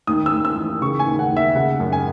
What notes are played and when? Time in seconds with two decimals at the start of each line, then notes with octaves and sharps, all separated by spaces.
0.07 D#2 D#6
0.26 E6
0.32 D#2
0.45 E6
0.56 E3
0.81 C#3 C#6
0.99 G#5
1.07 D#2
1.19 F#5
1.32 D#2 E5
1.55 C#3 F#5
1.80 F#2
1.93 G#5